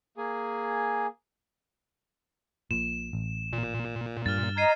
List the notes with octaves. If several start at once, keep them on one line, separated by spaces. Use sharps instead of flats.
A#3 G#4 G#5
A#1 A#2 E7
A1
A#2
G2 F6 A6
D#5 A#5 G#6 C7 D#7